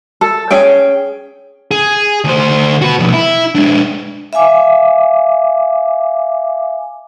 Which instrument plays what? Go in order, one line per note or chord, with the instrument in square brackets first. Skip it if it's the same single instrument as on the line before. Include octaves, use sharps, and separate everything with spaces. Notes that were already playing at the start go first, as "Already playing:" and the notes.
[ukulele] A4
C#4 G#4 G5
[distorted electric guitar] G#4
D2 C5
F#4 B4
B2 F3
E4
G#3 D4
[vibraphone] E5 F5 G#5 D6